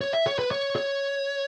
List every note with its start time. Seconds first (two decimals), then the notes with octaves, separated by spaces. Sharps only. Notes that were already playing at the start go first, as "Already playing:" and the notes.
0.01 C#5
0.13 E5
0.27 C#5
0.39 B4
0.51 C#5
0.76 C#5